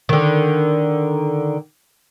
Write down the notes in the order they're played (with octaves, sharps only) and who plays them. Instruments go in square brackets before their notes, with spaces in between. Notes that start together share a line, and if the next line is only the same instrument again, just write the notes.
[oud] D3 D#3